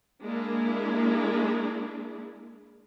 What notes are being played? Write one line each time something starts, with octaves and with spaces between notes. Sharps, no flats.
G#3 A#3 D4 E4 G#4